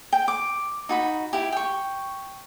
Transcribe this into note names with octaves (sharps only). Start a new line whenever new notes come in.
G5
D6
D#4 F#4 B5
E4 G4
G5 C#6